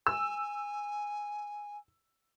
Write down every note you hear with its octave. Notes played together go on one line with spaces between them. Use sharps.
G#5 E6